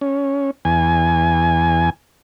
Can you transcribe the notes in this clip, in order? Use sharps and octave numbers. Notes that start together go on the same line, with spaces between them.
C#4
E2 G#5